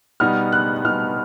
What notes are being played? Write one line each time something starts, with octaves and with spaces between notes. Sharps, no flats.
B2 G3 B3 D#4 F6
F#6
B2 G3 B3 D#4 F6